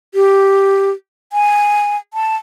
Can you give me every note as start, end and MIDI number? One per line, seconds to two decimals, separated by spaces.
0.15 0.90 67
1.33 1.97 80
2.14 2.36 81